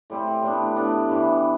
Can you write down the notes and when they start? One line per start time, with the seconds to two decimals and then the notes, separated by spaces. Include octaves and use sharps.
0.10 A2 G3 C4
0.43 A2 G3 B3 D4
0.76 A2 G3 B3 D4
1.09 G2 E3 G3